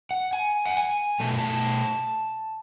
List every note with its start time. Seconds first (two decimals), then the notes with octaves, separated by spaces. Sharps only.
0.11 F#5
0.33 G#5
0.66 F#5
0.77 G#5
1.20 B2 A3 A5
1.38 A5